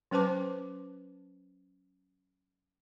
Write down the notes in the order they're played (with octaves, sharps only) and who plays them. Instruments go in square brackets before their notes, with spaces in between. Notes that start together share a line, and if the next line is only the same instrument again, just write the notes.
[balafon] F#3 C#4 B4 C5 A5 D6